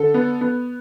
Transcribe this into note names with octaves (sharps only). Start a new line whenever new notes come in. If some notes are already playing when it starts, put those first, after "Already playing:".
Already playing: D3 A4
B3
B3